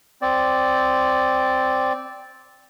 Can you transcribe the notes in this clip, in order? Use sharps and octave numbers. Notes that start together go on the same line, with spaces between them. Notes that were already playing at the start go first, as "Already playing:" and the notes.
C4 D5